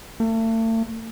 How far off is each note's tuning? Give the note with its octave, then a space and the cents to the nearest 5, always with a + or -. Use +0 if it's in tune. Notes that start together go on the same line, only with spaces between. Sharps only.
A3 +40